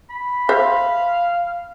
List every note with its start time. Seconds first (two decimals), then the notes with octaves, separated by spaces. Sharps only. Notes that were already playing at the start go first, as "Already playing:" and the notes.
0.10 B5
0.49 C5 E5 F5